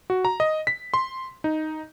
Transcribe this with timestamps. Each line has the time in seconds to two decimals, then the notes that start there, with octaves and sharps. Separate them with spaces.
0.10 F#4
0.25 A#5
0.40 D#5
0.67 B6
0.94 C6
1.44 D#4